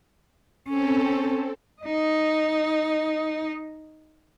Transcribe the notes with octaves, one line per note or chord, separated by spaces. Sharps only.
C4 C#4 A4
D#4 D#5